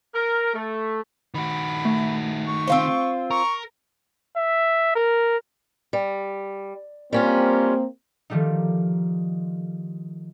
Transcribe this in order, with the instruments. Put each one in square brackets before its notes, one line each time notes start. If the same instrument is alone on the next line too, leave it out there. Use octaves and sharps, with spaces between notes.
[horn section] A#4
A3
[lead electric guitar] D#3 F#4 [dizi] B5
[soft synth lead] A3
[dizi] C#6
[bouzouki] C4 F4 C5
[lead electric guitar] A#4 [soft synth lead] A#5 [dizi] C#6
[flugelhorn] E5
A#4
[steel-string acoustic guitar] G3
[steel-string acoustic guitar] G3 C#4 F4 [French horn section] A#3 C4
[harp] D#3 F3 G3 A3 D#4